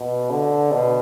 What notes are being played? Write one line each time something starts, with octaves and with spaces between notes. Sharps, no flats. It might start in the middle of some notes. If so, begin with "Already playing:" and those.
Already playing: B2
D3
B2